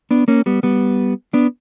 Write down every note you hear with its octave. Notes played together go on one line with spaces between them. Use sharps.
B3 D4
A#3 C#4
G3 B3
G3 B3
B3 D4